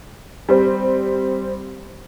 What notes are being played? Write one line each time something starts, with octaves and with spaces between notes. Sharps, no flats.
G3 C4